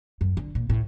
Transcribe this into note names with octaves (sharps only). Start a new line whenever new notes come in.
F#2
D3
A#2
A2